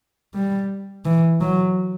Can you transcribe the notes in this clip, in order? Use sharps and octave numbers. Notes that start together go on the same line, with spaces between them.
G3
E3
F#3